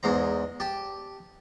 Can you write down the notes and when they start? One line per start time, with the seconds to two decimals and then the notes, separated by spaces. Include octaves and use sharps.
0.03 E2 G#2 C5 A#5
0.60 G4 A5